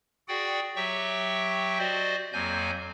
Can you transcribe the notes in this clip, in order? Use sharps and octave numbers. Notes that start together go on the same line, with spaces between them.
F#4 G#4 D5 F#5 G5
F#3 G4 E5 G5 C#6
F#4 C5 D5 D#5
F2 F#3 A#3 G#5 G6